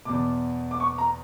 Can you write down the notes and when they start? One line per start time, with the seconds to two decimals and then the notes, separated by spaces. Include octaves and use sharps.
0.05 E2 B2 D6
0.71 D6
0.80 C#6
0.98 A#5